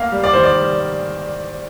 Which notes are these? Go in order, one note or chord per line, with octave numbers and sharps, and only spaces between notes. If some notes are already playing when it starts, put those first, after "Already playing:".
Already playing: A#3 F5
G3
D5
D#3 C5
D5
G3